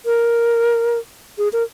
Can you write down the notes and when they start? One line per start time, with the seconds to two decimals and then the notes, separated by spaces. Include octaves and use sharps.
0.06 A#4
1.38 G#4
1.53 A#4